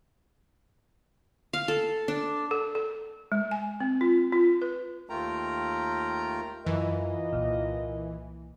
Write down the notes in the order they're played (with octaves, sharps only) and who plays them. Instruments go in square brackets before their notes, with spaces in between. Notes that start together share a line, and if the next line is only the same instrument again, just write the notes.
[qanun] F5
A4
D4
[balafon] A4
A4
G#3
G#5
C4
F4
F4
B4
[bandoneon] D#2 A3 F4 A#4 G5 A#5
[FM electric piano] F#2 [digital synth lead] E3 [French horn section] F4 A#4 D#5
[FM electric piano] C2 A#2